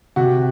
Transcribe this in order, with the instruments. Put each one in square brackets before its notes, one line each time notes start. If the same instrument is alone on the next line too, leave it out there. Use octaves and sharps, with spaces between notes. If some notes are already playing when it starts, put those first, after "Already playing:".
[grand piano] C3 F#4